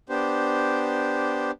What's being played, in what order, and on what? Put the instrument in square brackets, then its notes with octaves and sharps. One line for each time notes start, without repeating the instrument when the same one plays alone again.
[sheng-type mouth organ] B3 D4 G4 C5